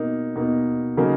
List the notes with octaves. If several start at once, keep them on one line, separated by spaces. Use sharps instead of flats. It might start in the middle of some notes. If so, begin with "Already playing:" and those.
Already playing: B2 A#3 D#4
B2 A#3 D#4
C#3 F#3 A#3 D#4